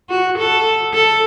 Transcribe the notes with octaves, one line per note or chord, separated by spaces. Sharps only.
F#4
A4
A4